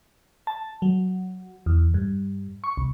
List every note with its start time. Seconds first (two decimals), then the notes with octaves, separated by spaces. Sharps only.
0.47 A5
0.82 F#3
1.66 E2
1.94 G2
2.64 C#6
2.77 C2